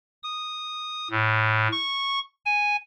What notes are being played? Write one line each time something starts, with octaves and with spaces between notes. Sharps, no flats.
D#6
A2
C#6
G#5